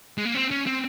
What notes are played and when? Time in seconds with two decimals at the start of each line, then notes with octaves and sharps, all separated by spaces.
0.18 G#3
0.25 A#3
0.35 C4
0.51 C#4
0.66 C4